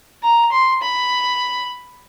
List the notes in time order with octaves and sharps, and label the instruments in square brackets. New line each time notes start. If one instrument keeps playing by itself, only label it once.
[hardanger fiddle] A#5
C6
B5